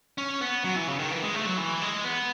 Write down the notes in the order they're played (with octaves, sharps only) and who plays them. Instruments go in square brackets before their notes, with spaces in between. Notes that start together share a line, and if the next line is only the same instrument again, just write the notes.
[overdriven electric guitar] C#4
B3
F#3
E3
C#3
D#3
E3
G#3
A3
F#3
E3
G#3
B3